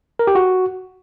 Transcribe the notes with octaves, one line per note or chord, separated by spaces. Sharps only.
A#4
G4
F#4